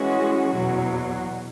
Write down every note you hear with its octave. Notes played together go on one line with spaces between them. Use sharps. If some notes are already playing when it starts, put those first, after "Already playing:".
Already playing: E3 G#3 C#4 F#4
E2 B2 F#3